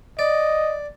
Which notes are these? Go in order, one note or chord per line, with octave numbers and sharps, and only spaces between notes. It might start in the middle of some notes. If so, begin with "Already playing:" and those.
D5 D#5